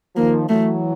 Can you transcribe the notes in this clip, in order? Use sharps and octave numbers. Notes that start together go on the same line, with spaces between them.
D#3 F3 A#3
E3 F#3 A3